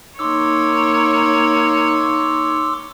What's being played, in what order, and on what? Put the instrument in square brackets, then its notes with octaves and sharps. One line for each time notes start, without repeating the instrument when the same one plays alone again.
[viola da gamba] A#3 C#5 [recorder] D#4 [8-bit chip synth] C6 D6 E6